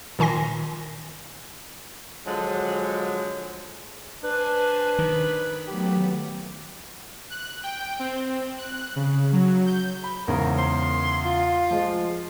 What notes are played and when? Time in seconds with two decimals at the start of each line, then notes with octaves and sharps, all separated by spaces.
0.19 A#2 D#3 G#5 C6 A#6
2.26 D3 F3 F#3 G#3
4.24 D4 B4 C5 G#5
4.99 D#3 B5
5.67 F#3 A3 B3 G4
7.30 F#6
7.63 G5
7.99 C4
8.58 F#6
8.96 C#3
9.32 F#3
9.66 G6
10.04 B5
10.28 E2 G#2 C#3 A#4
10.58 C6
11.25 F4
11.70 F3 G#3